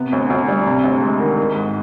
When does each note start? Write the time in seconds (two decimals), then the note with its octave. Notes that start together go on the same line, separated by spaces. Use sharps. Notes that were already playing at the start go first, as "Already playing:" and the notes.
Already playing: C3 B3
0.12 D2
0.30 D2
0.48 G3
0.66 C3
0.84 D2
1.02 G#3
1.20 D#3
1.38 D#3
1.55 G#2